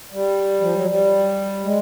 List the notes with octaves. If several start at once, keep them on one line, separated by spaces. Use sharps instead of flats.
G3
F3
F#3
G3
G#3